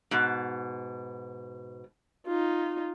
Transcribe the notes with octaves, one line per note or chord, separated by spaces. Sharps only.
G#2 B2
D#4 F4